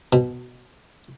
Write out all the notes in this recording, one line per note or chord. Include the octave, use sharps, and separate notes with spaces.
B2